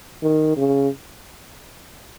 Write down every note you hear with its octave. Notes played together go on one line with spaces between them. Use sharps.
D#3
C#3